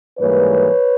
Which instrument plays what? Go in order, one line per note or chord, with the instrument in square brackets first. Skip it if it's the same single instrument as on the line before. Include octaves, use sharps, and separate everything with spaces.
[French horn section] G#2 E3 G3 A#3 B4 C#5